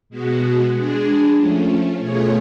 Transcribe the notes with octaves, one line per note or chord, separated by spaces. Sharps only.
B2 G#3 B3 F#4
G#3 D4 G#4
F3 A3 C#4
B2 A3 F4 G#4 C#5